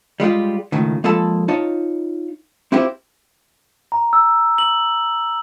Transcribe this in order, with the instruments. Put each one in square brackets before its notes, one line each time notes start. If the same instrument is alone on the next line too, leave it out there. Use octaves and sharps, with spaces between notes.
[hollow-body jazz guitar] G3 G#3 F4 G4
C#2 A2 D#3
F3 G#3 A#3 A4 A5 B5
D#4 F4 C#5 A5
C4 E4 F4 G4 C5
[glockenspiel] A#5
E6
F#7